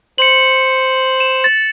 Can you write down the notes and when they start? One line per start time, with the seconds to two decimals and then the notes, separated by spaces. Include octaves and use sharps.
0.18 C5 C#7 F#7
1.20 E7
1.44 A6